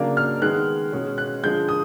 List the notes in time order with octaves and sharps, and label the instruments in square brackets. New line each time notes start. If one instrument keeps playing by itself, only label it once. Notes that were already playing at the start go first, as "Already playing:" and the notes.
Already playing: [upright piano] C#3 F#3 A#3 D4
F6
D#3 G#3 B3 F#6
B2 G#3 C#4
F#6
D3 F3 G#3 G6
D#6